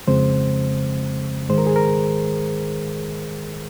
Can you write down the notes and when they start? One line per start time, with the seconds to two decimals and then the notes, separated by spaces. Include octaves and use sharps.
0.07 F2 C#3 F3 G#3 C4 C5
1.49 G#2 D#3 G#3 C5
1.58 A#4
1.67 G#4
1.76 A#4